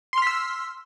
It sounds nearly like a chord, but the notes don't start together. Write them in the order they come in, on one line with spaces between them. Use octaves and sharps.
C6 F6 B6 E6